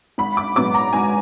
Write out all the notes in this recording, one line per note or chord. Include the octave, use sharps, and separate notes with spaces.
G#1 B5
D6
G#2 F#3 B3 D6
A#5
G#1 G#5